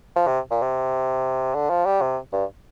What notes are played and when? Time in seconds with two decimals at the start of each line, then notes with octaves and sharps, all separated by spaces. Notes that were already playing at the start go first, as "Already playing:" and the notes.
0.16 F3
0.27 C3
0.51 A#2
0.62 C3
1.55 D3
1.70 F3
1.86 G3
2.01 C3
2.32 G2